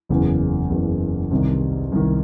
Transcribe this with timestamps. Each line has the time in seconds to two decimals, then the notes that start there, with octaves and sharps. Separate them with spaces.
0.09 F#1 E2 C#3
0.70 F#1 E2 C#3
1.31 C2 C3 D#3
1.92 C2 C3 D#3